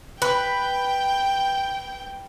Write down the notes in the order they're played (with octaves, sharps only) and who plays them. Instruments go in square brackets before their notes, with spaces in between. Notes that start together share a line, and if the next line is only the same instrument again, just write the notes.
[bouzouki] B4 [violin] G5